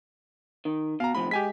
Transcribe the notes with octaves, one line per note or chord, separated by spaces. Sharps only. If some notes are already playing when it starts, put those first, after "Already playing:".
D#3
B2 F5 A#5
A2 C3 F3 B5
G#3 G4 G#5 B6